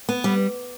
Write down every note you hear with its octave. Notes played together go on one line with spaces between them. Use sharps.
B3
G3